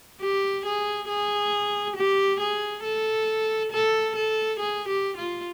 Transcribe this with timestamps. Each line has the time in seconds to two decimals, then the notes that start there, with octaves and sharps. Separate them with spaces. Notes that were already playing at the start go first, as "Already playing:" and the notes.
0.21 G4
0.65 G#4
1.08 G#4
1.96 G4
2.40 G#4
2.83 A4
3.72 A4
4.16 A4
4.59 G#4
4.88 G4
5.17 F4